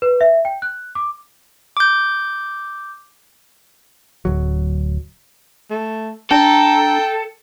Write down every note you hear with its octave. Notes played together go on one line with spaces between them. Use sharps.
B4
E5
G5
F#6
D6
D6 G6
D1 F#3
A3
D4 A4 G5 A#5